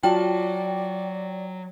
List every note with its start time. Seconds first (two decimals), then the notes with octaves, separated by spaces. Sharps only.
0.03 F#3 F4 F#4 D5 G5 A5